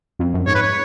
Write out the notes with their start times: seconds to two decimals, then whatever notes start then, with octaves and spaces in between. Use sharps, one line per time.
0.19 F2
0.34 F#2
0.47 G#2 C#5
0.55 B4
0.62 C#5